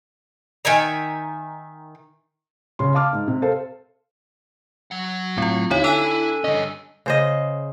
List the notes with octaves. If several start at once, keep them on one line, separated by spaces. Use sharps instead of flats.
D#3 E5 G#5 A#5
C#3 C#4 C6
F5 A5 D6 F6
G#2
C3
A4 C5 F5
F#3 F#5
A2 C4 F4
D#2 D3 C4 D#4 E4 C#5 F5
D4 A4 G5 G#5 E6 F#6 D#7
G2 D3 C#4 D#5
C#3 C5 D#5